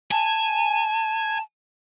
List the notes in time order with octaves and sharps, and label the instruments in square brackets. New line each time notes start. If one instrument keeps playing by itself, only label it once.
[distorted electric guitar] G#5 [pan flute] A5